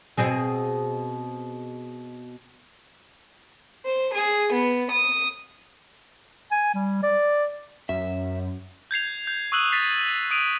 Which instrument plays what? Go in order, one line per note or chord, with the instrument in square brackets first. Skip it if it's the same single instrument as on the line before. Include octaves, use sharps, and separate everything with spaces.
[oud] B2 C4 G#4
[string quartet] C5
G#4
B3
D#6
[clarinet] G#5
G3
D5
[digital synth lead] F#2 [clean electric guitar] E5
[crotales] G6 G#6 C7 F7
G6
C#6 D#6 E6 F#6 D#7 F#7
A6 B6 C7
D#6 D7 D#7 F7